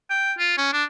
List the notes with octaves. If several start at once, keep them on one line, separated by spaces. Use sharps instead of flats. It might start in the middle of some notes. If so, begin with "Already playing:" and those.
G5
F4
C#4
D4